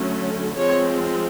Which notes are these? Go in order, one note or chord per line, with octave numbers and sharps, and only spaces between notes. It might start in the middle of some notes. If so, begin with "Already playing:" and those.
Already playing: D3 F#3 A3 C#4
F3 G#3 C4 C#5